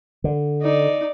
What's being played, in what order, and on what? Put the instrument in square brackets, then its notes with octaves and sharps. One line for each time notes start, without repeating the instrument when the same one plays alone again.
[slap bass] D3
[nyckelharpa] D#4 D5